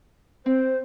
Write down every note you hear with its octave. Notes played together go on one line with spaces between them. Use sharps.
C4 C5